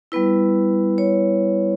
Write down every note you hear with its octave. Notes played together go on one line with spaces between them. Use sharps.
G3 B3 E4 B4
C#5